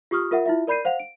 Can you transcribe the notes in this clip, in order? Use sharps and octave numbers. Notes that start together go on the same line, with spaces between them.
F4 G4 C#6 D#6 F6
F4 A#4 E5 F#5
E4 F4 E5
A#4 D5 B5 G6 C7 D#7
C5 F5 F#5 F7
D7